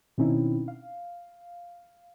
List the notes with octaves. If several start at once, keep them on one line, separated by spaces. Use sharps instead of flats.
B2 D#3 C4 C#4 D#4 E4
F5